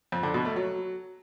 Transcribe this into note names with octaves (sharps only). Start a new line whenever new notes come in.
F2
D3
B2
A3
F#3